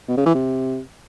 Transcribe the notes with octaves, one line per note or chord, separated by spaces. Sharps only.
B2
C#3
E3
C3